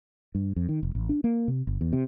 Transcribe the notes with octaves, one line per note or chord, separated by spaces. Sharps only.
G2
F2
D#3
F1
A1
D4
A#3
C3
G1
E2
C3